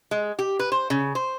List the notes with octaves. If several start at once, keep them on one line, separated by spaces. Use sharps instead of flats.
G#3
G4
B4
C5
C#3
C5